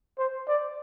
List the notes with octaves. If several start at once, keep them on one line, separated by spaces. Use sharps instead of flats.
C5
D5